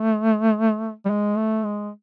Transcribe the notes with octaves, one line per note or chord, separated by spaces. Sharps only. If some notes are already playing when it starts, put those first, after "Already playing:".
Already playing: A3
G3
G#3
A3
G#3